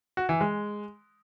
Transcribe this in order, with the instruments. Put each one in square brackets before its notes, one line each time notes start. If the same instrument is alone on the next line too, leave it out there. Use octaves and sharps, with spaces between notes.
[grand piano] F#4
E3
G#3